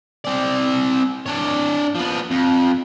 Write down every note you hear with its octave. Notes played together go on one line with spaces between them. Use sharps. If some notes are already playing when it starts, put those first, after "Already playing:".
C4 D5
D4 C#5
F3 B3
F2